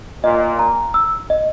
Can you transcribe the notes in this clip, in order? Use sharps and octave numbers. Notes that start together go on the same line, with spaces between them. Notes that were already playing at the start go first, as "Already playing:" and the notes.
A#2 D#5
A#5
E6
D#5